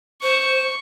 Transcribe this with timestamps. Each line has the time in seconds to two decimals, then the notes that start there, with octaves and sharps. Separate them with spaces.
0.23 C5 C#6